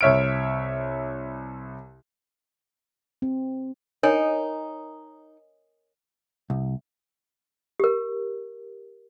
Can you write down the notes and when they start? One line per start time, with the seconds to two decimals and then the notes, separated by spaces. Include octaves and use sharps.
0.01 C2 C#5 E5 F6 D7
3.22 C4
4.03 D#4 A#4 C#5 G#5
6.50 C2
7.80 G4 A#4